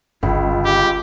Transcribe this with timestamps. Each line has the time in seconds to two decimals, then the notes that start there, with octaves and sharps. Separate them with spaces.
0.23 G1 C#2 F4
0.65 G4